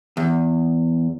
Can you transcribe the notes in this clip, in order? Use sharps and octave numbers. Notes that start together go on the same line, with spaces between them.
E2